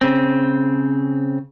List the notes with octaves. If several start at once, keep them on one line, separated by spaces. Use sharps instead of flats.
C#3 C4